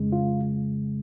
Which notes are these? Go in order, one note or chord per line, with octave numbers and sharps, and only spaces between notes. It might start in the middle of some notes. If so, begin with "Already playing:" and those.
Already playing: F2 C#3 G#3
F4